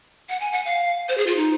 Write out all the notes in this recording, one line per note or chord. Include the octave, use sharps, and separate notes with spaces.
F#5
G#5
F#5
F5
C5
G#4
F4
D#4